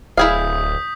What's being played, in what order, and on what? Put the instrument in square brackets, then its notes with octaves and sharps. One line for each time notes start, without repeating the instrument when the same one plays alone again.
[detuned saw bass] D1 [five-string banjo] E4 G#4 F5 [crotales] D#6 G6 B6